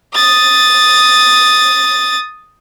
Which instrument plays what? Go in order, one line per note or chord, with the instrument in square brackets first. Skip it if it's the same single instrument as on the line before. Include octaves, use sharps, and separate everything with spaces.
[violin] D#6 A6